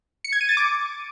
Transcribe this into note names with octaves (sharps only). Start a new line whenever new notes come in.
C#7
G#6
D#7
A6
D6